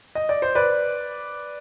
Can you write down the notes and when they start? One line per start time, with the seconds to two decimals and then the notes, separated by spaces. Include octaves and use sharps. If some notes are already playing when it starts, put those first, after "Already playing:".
0.15 D#5
0.29 D5
0.42 C5
0.55 B4 D5